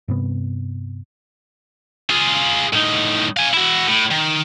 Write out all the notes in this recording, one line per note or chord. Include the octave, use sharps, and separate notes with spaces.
G2 C3 B3
F4 G#4
A2 D#4
F5 G#5
E4 F#4
A2
D#3